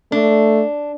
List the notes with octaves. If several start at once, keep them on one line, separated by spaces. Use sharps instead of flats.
A3 D4